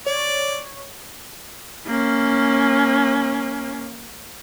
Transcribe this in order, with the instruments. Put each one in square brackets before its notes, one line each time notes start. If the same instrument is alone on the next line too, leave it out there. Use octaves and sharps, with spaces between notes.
[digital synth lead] C#5 [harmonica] D5
[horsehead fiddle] A#3 C#4